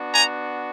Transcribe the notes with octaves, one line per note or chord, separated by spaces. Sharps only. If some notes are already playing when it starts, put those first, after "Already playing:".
Already playing: B3 D4 F#4
G#5 A#5